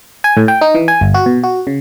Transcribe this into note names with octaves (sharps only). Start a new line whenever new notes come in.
G#5
A2
G5
D#4
E3
G#5
G1
F#4
B2
F#4
C#3